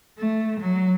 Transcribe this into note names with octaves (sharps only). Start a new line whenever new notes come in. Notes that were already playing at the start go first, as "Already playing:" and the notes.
A3
F#3